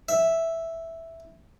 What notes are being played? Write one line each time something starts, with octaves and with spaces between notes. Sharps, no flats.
E5